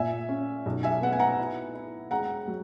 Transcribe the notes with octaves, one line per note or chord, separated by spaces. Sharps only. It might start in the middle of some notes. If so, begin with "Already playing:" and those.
Already playing: A#2 E5 G#5
C#4
B1
E5 G#5
B3 F#5
G#5
F#5 A#5
E4
E4
E1 F#5 A#5
F#3